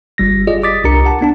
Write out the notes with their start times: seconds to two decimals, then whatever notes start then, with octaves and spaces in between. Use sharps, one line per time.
0.18 G1 G3 A#6
0.47 F4 G4 G#4 D5 D#5
0.63 D6 D#6 A6 B6
0.84 C2 D4 G4 A#4 A#5 C#7
1.05 F#5 A5
1.21 B3 D4 A5